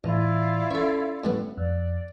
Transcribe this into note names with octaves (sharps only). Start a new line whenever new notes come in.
A1 A2 E3 E4 F4 D5
C#4 A4 C#5 E5
A2 G3 B3
F2 D5